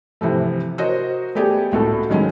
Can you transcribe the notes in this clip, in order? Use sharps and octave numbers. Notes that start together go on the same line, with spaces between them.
C3 E3 F3 A3
F#4 A#4 C5 C#5 D#5 F#5
A3 B3 G4 G#4 D5
C#2 A2 F#4 A4
D#3 F#3 G#3 C#4